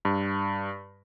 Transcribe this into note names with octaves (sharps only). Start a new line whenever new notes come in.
G2